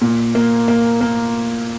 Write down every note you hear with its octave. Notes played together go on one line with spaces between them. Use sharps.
A#2
A#3
A#3
A#3